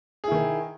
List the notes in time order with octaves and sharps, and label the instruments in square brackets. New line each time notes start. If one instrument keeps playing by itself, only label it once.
[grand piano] G#4
E4
D#3